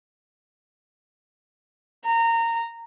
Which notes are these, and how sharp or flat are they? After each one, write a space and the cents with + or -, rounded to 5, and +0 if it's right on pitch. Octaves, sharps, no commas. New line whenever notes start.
A#5 -20